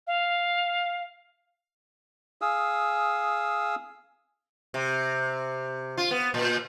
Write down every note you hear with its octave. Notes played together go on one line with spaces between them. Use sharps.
F5
G#4 F5 D#6 E6
C3
F4
B3
A#2